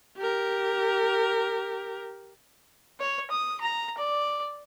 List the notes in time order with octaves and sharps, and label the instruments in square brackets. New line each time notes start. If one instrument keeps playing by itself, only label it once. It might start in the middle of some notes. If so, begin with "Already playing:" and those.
[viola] G4 A#4
[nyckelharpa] C#5
D#6
A#5
D5